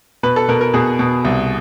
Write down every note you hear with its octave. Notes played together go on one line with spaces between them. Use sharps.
B2 B4
A4
B2 A#4
A#4
B2 G#4
B2
C2